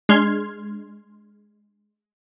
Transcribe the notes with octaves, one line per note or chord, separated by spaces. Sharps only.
G#3 D4 C6 F6 G#6